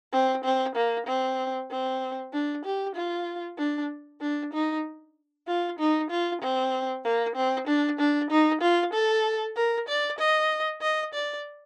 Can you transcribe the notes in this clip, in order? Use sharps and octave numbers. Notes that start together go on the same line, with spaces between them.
C4
C4
A#3
C4
C4
D4
G4
F4
D4
D4
D#4
F4
D#4
F4
C4
A#3
C4
D4
D4
D#4
F4
A4
A#4
D5
D#5
D#5
D5